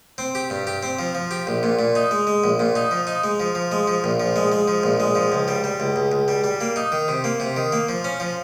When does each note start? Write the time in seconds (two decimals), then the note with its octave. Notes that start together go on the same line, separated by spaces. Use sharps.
0.18 C4
0.35 G4
0.50 G2
0.67 G4
0.83 C4
0.99 F3
1.15 F3
1.31 G4
1.47 A#1
1.63 A#2
1.79 A#2
1.95 D#4
2.11 G#3
2.27 G#3
2.44 A#1
2.60 A#2
2.76 D#4
2.91 F3
3.07 D#4
3.24 G#3
3.40 F3
3.55 F3
3.72 G#3
3.87 F3
4.04 A#1
4.20 F3
4.36 G#3
4.52 G#3
4.68 F3
4.83 A#1
5.00 G#3
5.15 F3
5.32 C#2
5.48 G3
5.64 G3
5.80 C#2
5.96 C#2
6.12 C#2
6.28 G3
6.44 G3
6.61 A#3
6.76 D#4
6.92 D#3
7.08 C3
7.24 A#3
7.40 C3
7.56 D#3
7.72 A#3
7.89 F3
8.04 C#4
8.20 F3